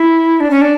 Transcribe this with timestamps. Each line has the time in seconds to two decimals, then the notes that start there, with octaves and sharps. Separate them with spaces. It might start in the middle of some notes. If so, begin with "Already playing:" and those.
Already playing: E4
0.40 D4
0.51 C#4
0.61 D4